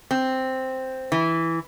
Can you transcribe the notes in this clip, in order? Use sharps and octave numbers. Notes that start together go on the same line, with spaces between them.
C4
E3